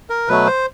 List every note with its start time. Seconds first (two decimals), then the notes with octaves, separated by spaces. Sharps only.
0.10 A#4
0.28 B2 F#3 A3 B4
0.47 C5